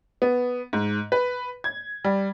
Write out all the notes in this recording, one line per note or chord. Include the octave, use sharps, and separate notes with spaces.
B3
G#2
B4
G#6
G3